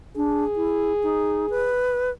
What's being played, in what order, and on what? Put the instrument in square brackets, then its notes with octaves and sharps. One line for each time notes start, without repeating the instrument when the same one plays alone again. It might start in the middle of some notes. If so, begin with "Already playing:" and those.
[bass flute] D4 [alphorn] G#4
[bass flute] E4
D#4
B4